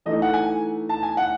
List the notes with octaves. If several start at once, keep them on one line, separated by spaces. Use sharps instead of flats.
E3 A3 D#4 D#5
F#5
G#5
A5
G#5
F#5